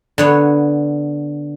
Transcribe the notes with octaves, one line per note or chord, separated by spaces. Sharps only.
D3 B3 C#5